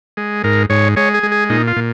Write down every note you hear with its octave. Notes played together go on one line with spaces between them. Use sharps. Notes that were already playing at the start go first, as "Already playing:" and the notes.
G#3
G#2 A#4
G#2 C#5
G#3 C#5
G#4
G#3
G#4
A#2 D#4
F4
A#2